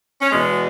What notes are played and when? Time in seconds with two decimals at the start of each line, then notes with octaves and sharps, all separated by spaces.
0.22 C#4
0.32 E2 B2 G#3 B3